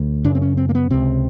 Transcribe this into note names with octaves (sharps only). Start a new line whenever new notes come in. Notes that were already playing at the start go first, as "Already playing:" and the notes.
Already playing: D2
F#2 C#3 D4
C4
C#4
C4
A#3
B3
C#2 C3 C4